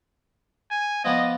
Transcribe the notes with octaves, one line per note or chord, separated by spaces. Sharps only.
G#5
F3 B3 D5 D#5